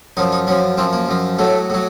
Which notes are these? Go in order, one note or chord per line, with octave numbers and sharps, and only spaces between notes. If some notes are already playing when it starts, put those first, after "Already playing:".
F#2 F3 D#4
D#4
F#2 F3 C#4
F#2 F3 C4
A#3
F#2 F3
A2 F#3 A3
A2 F#3